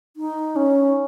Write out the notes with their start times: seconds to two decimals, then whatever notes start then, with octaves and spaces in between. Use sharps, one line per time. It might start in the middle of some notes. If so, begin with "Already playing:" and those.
0.17 D#4
0.56 C#4